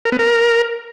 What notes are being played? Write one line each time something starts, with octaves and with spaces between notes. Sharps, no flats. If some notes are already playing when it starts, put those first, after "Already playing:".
A#4
B3
A#4